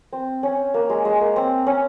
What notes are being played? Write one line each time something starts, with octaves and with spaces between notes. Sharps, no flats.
C4
C#4
A#3
G#3
G#3
A#3
C4
C#4